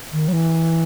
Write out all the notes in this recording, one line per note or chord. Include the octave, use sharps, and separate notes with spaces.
D#3
F#3
E3